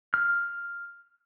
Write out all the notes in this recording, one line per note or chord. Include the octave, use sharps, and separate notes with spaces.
F6